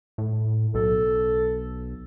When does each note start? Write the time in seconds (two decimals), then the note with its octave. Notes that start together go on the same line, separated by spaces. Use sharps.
0.18 A2
0.74 B1 A4